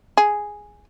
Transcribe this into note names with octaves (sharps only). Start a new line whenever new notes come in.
G#4